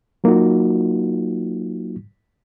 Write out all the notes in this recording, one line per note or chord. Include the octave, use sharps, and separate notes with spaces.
F#3 A#3 D#4 F4 F#4